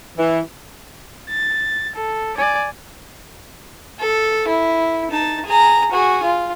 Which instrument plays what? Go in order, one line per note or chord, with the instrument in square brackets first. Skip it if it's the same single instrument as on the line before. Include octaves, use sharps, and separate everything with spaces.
[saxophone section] E3
[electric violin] A6
A4
D5 G#5
[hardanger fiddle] A4
E4
D#4 A5
G#4 A#5
F#4 G#4
F4